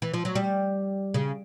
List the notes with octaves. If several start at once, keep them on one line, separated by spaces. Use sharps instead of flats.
E3
F3
F#3
G3
C#3